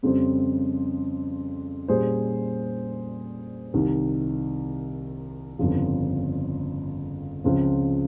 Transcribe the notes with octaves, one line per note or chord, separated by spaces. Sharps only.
F2 C#3 G3 C4
A#2 G3 C#4 G#4 C5
C2 C3 D#3
G1 F2 C#3 F3
C#2 C#3 F3 C4